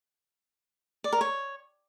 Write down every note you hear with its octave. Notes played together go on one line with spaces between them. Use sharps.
D5
A#4
C#5